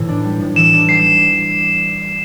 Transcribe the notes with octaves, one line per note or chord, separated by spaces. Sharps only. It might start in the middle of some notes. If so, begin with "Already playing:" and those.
Already playing: A2 E3
D4
G3
A2
E3 E7
D4
G3 C7